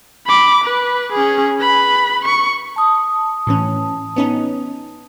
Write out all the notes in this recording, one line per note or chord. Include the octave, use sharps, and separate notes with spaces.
B5 D6
B4
C#4 G#4
B4 B5
C#6
A5 D#6
A2 E3 C#4
B3 C#4 D#4